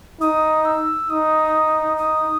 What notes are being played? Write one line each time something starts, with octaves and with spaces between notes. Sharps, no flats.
D#4 D#6
E6
D#4 D#6
D#6